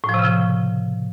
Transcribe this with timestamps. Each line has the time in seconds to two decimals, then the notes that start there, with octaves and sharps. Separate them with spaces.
0.04 A2
0.09 F3
0.14 C3
0.19 C#3
0.24 F3